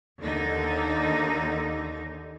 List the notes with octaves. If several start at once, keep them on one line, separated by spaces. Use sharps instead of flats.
D#2 D3 D#4